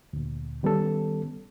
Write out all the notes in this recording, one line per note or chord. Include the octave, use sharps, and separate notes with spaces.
D2 A#2
D#3 G3 B3 C#4 A4